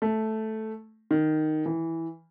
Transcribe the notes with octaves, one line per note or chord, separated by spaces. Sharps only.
A3
D#3
E3